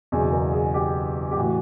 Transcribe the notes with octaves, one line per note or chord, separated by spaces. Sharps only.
F#1 E2 B2 G#4
A#4
G#4
G4
G4
A2 E3 F#4